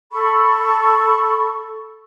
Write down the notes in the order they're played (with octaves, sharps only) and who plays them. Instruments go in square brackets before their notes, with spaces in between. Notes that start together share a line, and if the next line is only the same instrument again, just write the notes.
[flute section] A4 B5 C#6